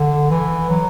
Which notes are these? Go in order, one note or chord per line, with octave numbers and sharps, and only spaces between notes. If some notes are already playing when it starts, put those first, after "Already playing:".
Already playing: D3
E3
F#3